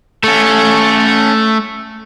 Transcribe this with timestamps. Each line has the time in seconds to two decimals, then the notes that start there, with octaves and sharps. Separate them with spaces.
0.24 A3 C#4 A4